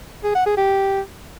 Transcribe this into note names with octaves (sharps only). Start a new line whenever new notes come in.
G#4
F#5
G#4
G4